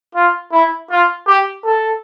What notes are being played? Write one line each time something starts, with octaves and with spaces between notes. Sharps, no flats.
F4
E4
F4
G4
A4